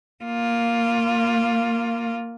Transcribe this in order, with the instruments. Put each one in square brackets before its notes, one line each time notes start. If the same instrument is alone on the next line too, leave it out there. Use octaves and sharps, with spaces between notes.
[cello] A#3 F4